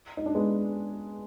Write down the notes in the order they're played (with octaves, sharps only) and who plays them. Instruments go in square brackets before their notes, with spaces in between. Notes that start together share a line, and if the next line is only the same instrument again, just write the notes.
[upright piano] D#4
D4
G#3 B3